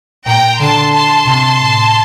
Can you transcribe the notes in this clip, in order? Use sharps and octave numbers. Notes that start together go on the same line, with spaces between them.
A#2 G5 A#5
D3 A5 C6
A5 C6
C3
A2